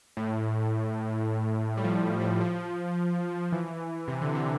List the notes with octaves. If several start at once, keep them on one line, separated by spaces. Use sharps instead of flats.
A2
G3
F3
G3
G3
F3
E3
C3
D3
C3